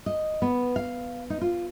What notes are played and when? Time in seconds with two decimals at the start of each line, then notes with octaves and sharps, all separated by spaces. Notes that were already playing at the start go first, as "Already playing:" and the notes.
0.06 D#5
0.42 B3
0.76 F5
1.30 D#4
1.41 F4